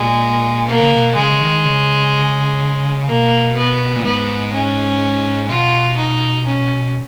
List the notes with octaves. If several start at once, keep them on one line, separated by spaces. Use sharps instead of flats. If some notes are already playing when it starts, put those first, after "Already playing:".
Already playing: A#2 G#3
B2 A#3
C#3
B2
C#3 G#3
C#3
D#3
C#3
B2 A#3
B3
A#2
G#2 B3
C#4
B2 F4
D#4
C#4